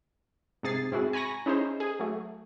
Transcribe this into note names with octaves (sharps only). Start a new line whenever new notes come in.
G#2 C3 G#4 A6 C7
G#2 C4 E4 F#4 G#4
G#5 A#5 B5 C#6 A#6
C#4 D#4 E4 G#4 C5
G#4
F#3 A3